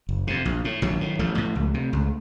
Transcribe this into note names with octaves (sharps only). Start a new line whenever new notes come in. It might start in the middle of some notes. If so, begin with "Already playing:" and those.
F#1
F2 C3
A#1
A2
A#1 D#3 F#3
A2
A1 F3 A3
A2
C#2
C3
C#2